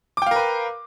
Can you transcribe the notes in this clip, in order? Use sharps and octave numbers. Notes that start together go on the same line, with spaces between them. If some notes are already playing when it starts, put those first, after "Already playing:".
A#4 B4 F5 G5 D6